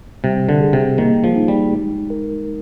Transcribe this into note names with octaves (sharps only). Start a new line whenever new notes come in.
C3 G3
D3
G#4
C3
D#3 A#3
F3
D#4
G3
G#3
A#4